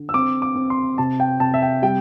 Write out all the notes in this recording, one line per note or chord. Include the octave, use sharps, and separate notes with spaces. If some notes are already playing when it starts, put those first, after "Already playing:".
Already playing: D3
E6
C4 D6
D6
C4
C6
C3 A5
G5
C3 A5
E5
G5
G3 G5